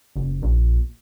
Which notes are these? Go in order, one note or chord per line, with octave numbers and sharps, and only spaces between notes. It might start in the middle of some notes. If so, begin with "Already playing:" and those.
F#1
A#1